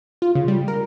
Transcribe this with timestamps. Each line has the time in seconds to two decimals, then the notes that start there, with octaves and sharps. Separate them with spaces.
0.22 F4
0.35 C#3
0.48 G3
0.68 A#4